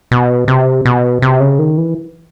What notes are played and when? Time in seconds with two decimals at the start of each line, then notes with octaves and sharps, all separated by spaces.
0.11 B2
0.48 C3
0.85 B2
1.22 C3
1.40 C#3
1.59 D#3
1.78 E3